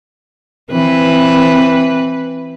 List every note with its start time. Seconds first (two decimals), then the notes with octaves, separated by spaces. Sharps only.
0.71 E3 C4 B4